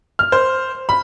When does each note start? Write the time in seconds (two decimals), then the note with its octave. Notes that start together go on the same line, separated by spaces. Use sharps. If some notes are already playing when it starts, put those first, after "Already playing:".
0.19 F6
0.32 C5
0.89 B5